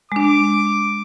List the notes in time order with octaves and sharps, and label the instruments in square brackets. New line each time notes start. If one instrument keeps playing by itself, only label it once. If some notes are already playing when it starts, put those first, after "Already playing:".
[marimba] G#3 D4 [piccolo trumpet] D6